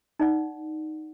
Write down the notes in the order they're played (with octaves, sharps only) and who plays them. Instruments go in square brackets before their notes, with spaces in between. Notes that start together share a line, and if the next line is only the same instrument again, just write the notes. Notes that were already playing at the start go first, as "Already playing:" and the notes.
[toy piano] D#4 D5 F#5